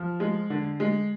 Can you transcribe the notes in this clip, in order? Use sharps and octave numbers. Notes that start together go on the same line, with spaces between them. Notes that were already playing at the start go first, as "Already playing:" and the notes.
Already playing: F3
G#3
D3
G#3